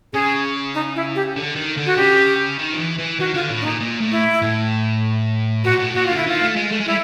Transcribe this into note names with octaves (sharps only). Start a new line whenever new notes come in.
C#3 G#4
D#4
E4
G4
D3
D#3
D3
F#4
C#3 G4
D#3
F3
E3
E3
D#3 F#4
D3 F4
A2
D4
A#2 D#4
A#2
A2
E4
A2
A#2 F#4
A2
A#2 F#4
D3 F4
E4
D#3 F4
A3
G#3
A3
G#3
G3 E4